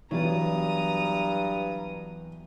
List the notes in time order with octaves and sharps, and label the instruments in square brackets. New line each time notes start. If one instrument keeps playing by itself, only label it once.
[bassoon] G2 [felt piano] E3 B3 F#4 [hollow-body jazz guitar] F#3 D5 [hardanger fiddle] A#5 D#6